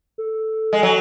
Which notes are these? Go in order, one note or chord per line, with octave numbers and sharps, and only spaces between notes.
A4
G#3
F#3 A4